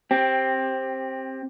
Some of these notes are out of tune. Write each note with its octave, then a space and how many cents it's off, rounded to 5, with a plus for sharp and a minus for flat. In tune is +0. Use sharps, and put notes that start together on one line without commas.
C4 +15 G4 +0